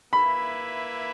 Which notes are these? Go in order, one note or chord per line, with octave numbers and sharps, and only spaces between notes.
A#3 E4 B4 E5 B5